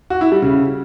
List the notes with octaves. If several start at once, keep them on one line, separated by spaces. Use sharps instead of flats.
F#4
E4
G3
C#3